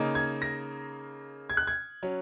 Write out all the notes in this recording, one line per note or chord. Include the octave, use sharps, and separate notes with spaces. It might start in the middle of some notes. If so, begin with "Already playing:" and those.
Already playing: C#3 A#3 D#4
G#6
A#6
G#6
F#6
G#6
F#3 C#4